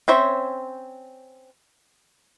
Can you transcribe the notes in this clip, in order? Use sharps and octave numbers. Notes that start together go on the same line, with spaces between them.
C4 C#4 C5 C#5 E5